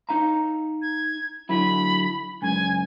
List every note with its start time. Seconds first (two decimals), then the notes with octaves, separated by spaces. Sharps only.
0.09 D#4 F5 A#5
0.82 G#6
1.49 D3 F#3 E4 B5
2.42 C#2 F#2 G#5